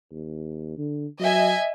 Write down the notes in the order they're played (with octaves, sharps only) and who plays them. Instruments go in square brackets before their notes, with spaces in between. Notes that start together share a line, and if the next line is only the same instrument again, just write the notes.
[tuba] D#2
D3
[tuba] F#3 [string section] D#5 E5 G#5